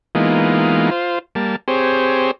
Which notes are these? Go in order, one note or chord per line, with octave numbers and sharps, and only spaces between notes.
E3 G#3 A#3 B3 D#4 F4
F4 C5
G3 A#3 A5
C4 G4 G#4 C5 C#5